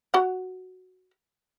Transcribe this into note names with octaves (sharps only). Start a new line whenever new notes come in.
F#4 F#5